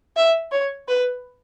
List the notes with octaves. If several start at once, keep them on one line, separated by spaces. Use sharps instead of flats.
E5
C#5
B4